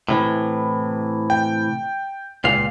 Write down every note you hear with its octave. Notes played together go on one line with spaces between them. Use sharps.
A2 C3 E3
G5
C#2 A#2 F5